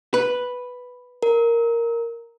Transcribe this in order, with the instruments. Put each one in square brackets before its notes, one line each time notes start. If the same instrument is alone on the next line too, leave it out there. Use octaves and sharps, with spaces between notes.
[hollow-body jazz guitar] B4
[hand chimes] A#4